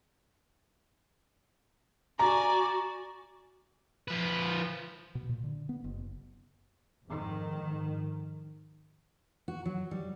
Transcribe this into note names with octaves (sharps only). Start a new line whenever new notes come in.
F#4 D5 G#5 A#5
F3 B4
B2
A#2
D3
B3
F#1
F2 G#2 D#3
F#4
F#3
G3